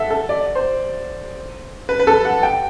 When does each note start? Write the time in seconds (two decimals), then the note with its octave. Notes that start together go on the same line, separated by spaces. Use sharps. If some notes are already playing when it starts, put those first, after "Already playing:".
Already playing: A4 E5 F#5
0.10 A4
0.29 D5
0.55 C5
1.89 B4
2.00 B4
2.07 A4
2.25 F#5
2.43 G5